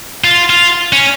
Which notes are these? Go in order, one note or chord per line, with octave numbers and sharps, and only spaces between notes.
F4
F4
C#4